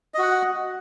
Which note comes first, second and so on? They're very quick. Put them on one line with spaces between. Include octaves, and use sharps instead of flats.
D#5 F#4 F#5